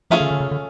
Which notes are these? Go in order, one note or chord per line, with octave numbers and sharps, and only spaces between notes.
F3 A3 C#4 F4 G#4
D3
D3
C#3
D3